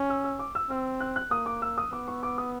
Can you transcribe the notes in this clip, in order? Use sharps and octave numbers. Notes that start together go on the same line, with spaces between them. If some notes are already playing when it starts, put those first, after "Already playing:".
Already playing: C#4
E6
E6
D6
E6
C4 E6
F#6
F#6
A#3 D#6
D6
E6
D#6
B3 D6
C#6
D6
D#6